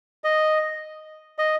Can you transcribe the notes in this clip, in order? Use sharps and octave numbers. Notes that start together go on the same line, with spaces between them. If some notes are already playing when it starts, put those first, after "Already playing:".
D#5
D#5